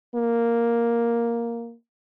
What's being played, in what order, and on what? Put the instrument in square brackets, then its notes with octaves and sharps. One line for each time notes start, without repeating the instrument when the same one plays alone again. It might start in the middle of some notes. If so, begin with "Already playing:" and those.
[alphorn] A#3